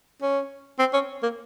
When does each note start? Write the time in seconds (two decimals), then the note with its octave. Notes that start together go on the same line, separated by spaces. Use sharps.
0.22 C#4
0.79 C4
0.94 C#4
1.23 A#3